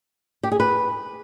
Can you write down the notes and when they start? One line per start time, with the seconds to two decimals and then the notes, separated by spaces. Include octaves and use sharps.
0.43 G4
0.52 G#4
0.60 B4